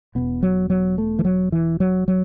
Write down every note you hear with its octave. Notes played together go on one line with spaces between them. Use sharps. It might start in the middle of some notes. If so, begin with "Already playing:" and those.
E1 E2 B2 B3
F#3
F#3
A3
E3
F#3
E3
F#3
F#3